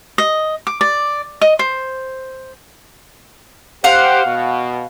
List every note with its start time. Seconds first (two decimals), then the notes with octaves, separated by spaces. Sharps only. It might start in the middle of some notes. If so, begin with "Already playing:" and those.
0.18 D#5
0.67 D6
0.81 D5
1.41 D#5
1.59 C5
3.84 G4 C5 F5 F#5
4.26 B2